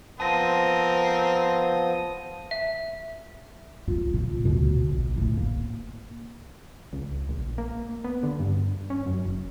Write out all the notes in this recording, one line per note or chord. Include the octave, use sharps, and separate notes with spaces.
F3 B3 C4 A#4 A5 D#6 A#6 D#7
E5
F4
A#2
D2 B2
A#1
A2
A#3
C#2
A#1
A#3
B3
D3
G2
C#4
F#2
F#1